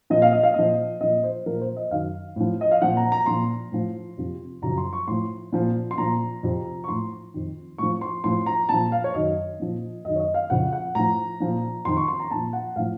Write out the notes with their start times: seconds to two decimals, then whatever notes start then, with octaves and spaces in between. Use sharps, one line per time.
0.10 A#2 F3 D#5
0.22 F5
0.32 D#5
0.43 F5
0.54 A#2 F3 D#5
1.01 A#2 F3 D#5
1.24 C5
1.46 A#2 F3 A#4
1.61 C5
1.76 D#5
1.91 F#2 D#3 F5
2.36 A2 F3
2.61 D#5
2.71 F5
2.82 A#2 F3 F#5
2.97 A#5
3.12 A#5
3.26 A#2 F3 C6
3.72 A2 F3
4.18 F2 C3 F3
4.62 F#2 C#3 F3 A#5
4.78 C6
4.93 C#6
5.08 A2 F3 C6
5.52 A#2 F3
5.91 C6
5.98 A#2 F3 A#5
6.43 F2 C3 F3
6.84 C#6
6.88 A2 F3 C6
7.34 F2 D#3
7.78 A2 F3 C#6
8.01 C6
8.24 A2 F3 C6
8.46 A#5
8.69 A#2 F3 A5
8.92 F5
9.04 C#5
9.14 F#2 D#3 D#5
9.60 A#2 F3
10.05 F#2 D#3 D#5
10.16 C#5
10.20 D#5
10.34 F5
10.50 F2 C#3 F3 F#5
10.73 F#5
10.95 A2 F3 A#5
11.40 A#2 F3
11.85 F2 D#3 C6
11.97 C#6
12.08 C6
12.20 A#5
12.31 A#2 F3 A5
12.53 F#5
12.76 A2 F3 F5